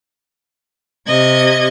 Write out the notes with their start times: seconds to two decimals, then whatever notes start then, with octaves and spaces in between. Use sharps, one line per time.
1.07 C3 D#5 G#6